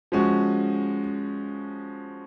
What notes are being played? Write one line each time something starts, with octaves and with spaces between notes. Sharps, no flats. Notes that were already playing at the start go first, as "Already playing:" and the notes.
F3 G#3 C#4 F#4